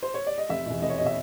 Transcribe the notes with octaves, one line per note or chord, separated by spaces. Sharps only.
C5
C#5
D5
D#5
F1 E5
E2 B2
F1 D#5
C#5
B2 D#5
E5